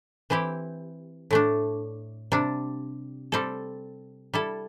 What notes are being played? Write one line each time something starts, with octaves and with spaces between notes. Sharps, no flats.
E3 C4 E4 G4
A2 A3 D4
C3 G3 D4
G3 C4 A4
G3 E4 A4